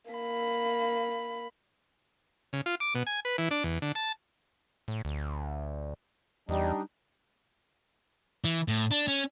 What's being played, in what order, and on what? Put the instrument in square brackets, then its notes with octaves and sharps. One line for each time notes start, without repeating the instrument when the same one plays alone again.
[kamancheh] A#3 B5
[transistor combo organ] C#3
F4
D6
B2
G#5
B4
E3
D4
E2
D3
A5
[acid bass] A2
D2
[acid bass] E2 [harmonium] G3 D4 D#4
[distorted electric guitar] E3
A2
D4
C#4